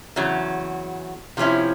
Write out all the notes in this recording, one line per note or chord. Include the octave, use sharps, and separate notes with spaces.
E2 C#3 F#3
C3 F3 G#3 C#4 E4